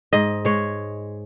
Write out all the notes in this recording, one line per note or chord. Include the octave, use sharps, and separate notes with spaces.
G#2 D#5
G#3 C#5